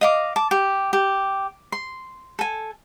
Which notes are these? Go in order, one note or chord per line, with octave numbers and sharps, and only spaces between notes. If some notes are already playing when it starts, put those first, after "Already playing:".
D#5 F5 D6
A5 D6
G4
G4
C6
A4 G#5